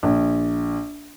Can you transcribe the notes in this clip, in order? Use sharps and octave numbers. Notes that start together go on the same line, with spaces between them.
A#1